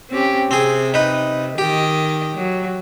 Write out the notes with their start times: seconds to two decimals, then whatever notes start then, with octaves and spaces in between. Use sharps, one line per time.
0.10 C4 C#4 G4
0.51 C3 C4 G#4
0.94 D#4 B4
1.58 D#3 G4 D#5
2.36 F#3